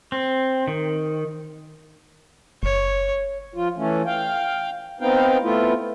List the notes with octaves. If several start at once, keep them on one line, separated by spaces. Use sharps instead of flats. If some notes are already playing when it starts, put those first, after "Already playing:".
C4
D#3
F#1 C#5
F3 F4
E3 A3 C#4
F5 G5
B3 C4 D#4 F5 G5
A3 B3 E4 F4